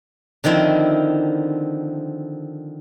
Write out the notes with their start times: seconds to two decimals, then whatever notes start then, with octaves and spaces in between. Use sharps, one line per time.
0.44 D3 D#3 F3 C4 E4